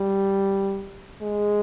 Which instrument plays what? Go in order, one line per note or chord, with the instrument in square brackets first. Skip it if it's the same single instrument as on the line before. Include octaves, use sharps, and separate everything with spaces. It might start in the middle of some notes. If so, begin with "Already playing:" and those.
Already playing: [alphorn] G3
G#3